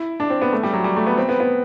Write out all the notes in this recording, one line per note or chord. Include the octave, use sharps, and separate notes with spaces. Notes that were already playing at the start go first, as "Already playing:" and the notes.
Already playing: E4
D4
C4
B3
A3
G3
F#3
G3
A3
B3
C4
B3
B3